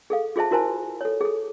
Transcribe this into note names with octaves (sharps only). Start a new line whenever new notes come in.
G#4 A4 F5
F4 G#4 C5 E5 A5
E4 F#4 A#4 C5 G#5 A5
A4 C#5
G#4 A4